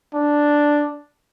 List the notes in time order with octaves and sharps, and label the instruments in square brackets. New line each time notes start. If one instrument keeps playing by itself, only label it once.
[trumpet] D4